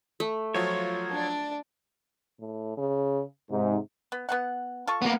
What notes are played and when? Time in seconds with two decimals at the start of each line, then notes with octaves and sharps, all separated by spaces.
0.20 A3
0.54 F3 F#3 F4 C#5
1.10 D4 D5
2.40 A2
2.77 C#3
3.51 G#2 C3
4.12 B3
4.29 B3 C4 F#5
4.87 F4 A4 C#6
5.02 A#3 B3